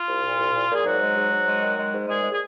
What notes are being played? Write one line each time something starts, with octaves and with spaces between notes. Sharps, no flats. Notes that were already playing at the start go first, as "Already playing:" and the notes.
Already playing: F4
C2
A#2
C2
A#2
A#2 G#4
G#2 F#3 F#4
G#3
G#2
G#2
G#3
D#3
G#3
G#2
A#2 G#3 G#4
G#3
G#4